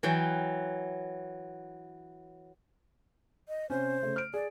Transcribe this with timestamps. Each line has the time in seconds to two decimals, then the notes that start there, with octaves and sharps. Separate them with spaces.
0.03 E3 F#3 G5
3.48 D#5
3.70 C3 C#4 C5
4.03 C#3 A3
4.16 F6 D7
4.34 G#4 D5